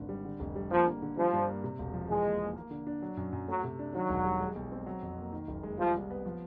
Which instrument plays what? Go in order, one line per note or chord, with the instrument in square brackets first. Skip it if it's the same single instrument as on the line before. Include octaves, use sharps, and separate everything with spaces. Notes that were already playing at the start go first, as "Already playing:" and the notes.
Already playing: [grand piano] G#1 D3
G3
D3
F1
G3
[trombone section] F3 [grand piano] A#3
[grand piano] D3
D3
[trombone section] F3 [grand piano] G3
[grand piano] G2
A#3
C3
E1
F3
[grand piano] E3 [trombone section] G#3
[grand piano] D#2
D#2
A#3
D3
D4
F#3
F#2
F#2
[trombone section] F#3 [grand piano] A3
[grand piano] C3
D4
[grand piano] D#3 [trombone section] F#3
[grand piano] E1
G3
G#3
B1
C4
F#3
F2
A#3
D#3
F#1
G#3
[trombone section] F3 [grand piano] G3
[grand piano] C2
B3
F3